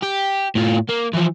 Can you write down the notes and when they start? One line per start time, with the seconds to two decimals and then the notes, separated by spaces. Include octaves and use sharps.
0.03 G4
0.55 A2 F4
0.89 A#3
1.13 E3 F3